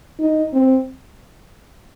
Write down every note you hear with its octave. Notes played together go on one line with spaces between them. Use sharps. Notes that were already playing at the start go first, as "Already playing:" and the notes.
D#4
C4